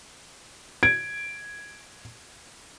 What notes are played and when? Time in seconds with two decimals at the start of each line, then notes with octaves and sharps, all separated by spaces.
0.83 G#6 D7